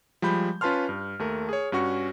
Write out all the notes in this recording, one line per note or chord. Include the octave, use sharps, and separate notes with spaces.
F3 G3 G#3 B5 G6
C#4 F4 B4 A5 C6 F6
G2
D#2 A3 A#4
G#4 C#5
G2 C#4 F#4 C#6